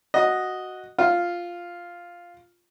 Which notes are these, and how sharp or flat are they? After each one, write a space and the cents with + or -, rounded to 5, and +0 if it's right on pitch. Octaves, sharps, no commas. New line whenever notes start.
F#4 +0 D#5 +0
F4 +0 F5 +0